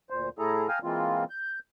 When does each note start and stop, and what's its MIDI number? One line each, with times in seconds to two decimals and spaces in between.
0.10 0.29 38
0.10 0.29 46
0.10 0.29 72
0.39 0.68 45
0.39 0.68 57
0.39 0.68 64
0.39 0.68 68
0.39 0.68 69
0.39 0.68 82
0.69 0.79 77
0.69 0.79 79
0.69 0.79 80
0.69 0.79 82
0.69 0.79 87
0.69 0.79 89
0.83 1.24 52
0.83 1.24 56
0.83 1.24 58
0.83 1.24 60
0.83 1.24 65
1.30 1.59 91